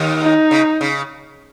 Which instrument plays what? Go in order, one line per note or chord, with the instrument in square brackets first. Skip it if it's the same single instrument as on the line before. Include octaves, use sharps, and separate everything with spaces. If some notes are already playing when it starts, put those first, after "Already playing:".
Already playing: [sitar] D#2 D#3
[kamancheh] D#4
[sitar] C#3
C#3